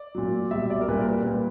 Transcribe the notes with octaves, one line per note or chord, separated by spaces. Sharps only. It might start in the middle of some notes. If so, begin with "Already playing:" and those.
Already playing: D5
A#2 F#3
B2 G3 E5
D5
A#4
A#2 G3 B4
A#4
B4
A#2 G3